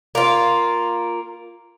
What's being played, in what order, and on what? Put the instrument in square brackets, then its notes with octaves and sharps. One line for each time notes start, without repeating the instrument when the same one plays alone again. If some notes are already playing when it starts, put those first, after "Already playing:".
[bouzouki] A#3 F4